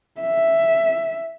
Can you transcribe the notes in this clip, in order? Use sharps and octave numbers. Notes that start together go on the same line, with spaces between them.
E5